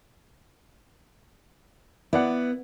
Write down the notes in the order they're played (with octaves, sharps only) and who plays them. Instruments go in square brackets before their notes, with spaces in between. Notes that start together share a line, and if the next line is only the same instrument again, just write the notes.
[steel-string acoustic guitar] B3 [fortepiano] E4 D5 F#5